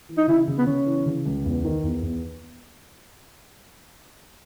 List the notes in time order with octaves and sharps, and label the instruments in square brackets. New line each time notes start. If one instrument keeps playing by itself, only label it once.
[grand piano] E3
[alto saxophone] D#4
[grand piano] C#3 [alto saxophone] E4
[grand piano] C#3
[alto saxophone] B3
[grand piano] C#3 [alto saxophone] C#4
[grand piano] E3
C#3
C#2
E2
D#3
E2
E2